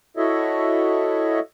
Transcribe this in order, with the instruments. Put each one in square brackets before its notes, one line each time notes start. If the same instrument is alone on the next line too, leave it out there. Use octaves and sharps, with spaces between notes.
[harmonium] E4 F#4 A4 C#5 D#5 E5